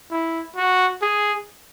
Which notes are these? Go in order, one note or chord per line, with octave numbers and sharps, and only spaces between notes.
E4
F#4
G#4